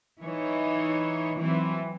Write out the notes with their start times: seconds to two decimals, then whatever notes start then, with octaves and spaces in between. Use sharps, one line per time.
0.22 E3 D#4 C#5
1.39 E3 F#3 C4